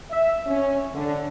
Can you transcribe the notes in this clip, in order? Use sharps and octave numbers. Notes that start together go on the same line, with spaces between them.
E5
C#4
D3